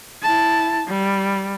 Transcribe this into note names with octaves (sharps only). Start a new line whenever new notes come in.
E4 A5
G3